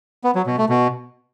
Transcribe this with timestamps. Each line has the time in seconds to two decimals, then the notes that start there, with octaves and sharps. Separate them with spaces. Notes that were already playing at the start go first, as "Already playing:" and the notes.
0.24 B3
0.35 F#3
0.47 B2
0.58 A3
0.69 B2